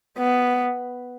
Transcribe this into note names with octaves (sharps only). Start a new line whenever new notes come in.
B3